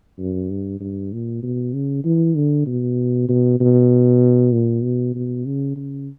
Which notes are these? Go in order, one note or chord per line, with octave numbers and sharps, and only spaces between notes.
F#2
G2
G2
A#2
B2
C#3
E3
D3
B2
B2
B2
A#2
B2
B2
C#3
C#3